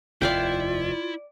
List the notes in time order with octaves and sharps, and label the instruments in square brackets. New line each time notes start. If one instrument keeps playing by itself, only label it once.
[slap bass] F1 D#2 [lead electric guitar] E4 [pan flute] F4 [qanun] D5 F5 G5